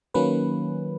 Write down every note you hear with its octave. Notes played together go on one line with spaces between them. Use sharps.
D#3 F#3 A#3 C#4 B4